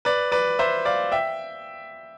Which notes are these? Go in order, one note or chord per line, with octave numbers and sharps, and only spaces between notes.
B4 D5
B4 D5
C5 E5
D5 F5
E5 G5